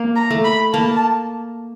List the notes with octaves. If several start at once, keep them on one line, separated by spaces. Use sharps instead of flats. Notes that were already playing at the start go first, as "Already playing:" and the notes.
Already playing: A#3
A#5
A3
B5
A#3 A5